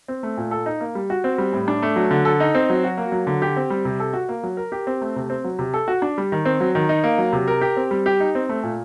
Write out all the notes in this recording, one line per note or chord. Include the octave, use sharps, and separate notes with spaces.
C4
A3
A#2
A4
D#4
A#3
G3
F#4
C4
G3
A2
D4
A3
F#3
D3
A4
D#4
C4
F#3
F#4
A#3
F#3
D3
G4
C4
G3
C3
A4
F#4
A#3
F#3
A#4
G4
C4
A3
C3
C4
F#3
C3
A4
F#4
D4
G3
D#3
C4
F#3
D#3
D#4
A#3
F#3
C3
A#4
G4
C4
G3
G4
D#4
C4
A3
A#2